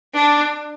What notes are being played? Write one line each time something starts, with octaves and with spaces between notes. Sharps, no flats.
D4